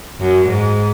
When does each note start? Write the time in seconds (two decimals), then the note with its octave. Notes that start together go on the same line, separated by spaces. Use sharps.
0.20 F#2
0.48 G#2